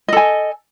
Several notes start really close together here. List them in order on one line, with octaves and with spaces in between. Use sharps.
D#5 A4 G#5